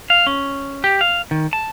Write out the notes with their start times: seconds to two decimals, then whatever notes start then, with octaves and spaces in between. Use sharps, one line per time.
0.10 F5
0.27 C#4
0.84 G4
1.01 F5
1.31 D#3
1.53 A5